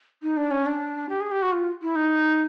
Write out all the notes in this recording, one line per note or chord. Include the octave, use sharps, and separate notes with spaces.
D#4
D4
C#4
D4
G4
G#4
G4
F#4
F4
E4
D#4